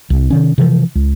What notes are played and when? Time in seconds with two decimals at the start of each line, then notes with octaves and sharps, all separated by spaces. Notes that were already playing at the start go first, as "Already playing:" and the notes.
0.10 C2
0.30 C3 D#3 C#4
0.58 C3 E3 F3
0.95 C#2